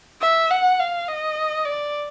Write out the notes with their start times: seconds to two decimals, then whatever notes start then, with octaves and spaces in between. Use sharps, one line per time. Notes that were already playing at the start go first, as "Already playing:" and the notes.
0.21 E5
0.50 F#5
0.79 F5
1.08 D#5
1.65 D5